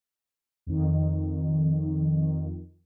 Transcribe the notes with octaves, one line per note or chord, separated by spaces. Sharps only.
F2 D#3